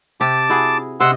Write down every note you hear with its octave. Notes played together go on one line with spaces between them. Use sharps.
C3 G4 A5 D6
E4 F#4 G#4
C3 D#5 F#5 C6 E6